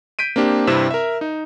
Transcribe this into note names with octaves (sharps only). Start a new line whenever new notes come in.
G6 B6 D7 D#7
A#3 C4 D4 G4
G2 C3 C4 E4 E5 E7
A#4 E5
D#4